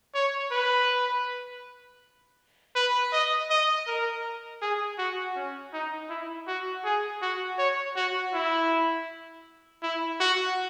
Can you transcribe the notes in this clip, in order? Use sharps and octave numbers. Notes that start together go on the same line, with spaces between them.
C#5
B4
B4
D#5
D#5
A#4
G#4
F#4
C#4
D#4
E4
F#4
G#4
F#4
C#5
F#4
E4
E4
F#4